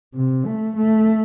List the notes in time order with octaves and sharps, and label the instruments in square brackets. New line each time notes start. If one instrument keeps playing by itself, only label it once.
[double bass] C3
A3
A3